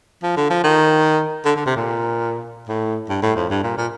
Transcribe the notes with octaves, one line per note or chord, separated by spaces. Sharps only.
F3
D3
F3
D#3
D3
D3
C3
A#2
A2
G2
A2
F2
G2
A#2
A#2